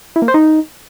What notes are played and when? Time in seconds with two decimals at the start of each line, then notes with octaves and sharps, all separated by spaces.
0.16 E4
0.22 A#3
0.28 C5
0.34 D#4